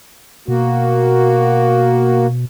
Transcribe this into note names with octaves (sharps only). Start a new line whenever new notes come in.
B2 A#3 F#4